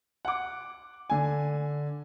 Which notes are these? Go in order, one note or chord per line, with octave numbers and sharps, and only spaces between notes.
F#5 D6
D3 G#5